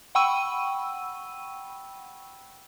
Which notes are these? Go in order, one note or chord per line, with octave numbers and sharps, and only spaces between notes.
F#5 G5 B5 C#6 E6 D#7